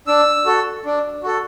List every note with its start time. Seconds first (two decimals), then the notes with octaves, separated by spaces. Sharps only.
0.07 D4 E6
0.46 F#4 A4
0.85 D4
1.23 F#4 A4